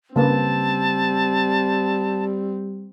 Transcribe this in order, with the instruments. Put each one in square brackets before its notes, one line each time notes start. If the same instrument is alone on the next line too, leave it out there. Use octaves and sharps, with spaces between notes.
[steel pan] C#3 A#3 B4 [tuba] G3 [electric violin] C4 [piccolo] A5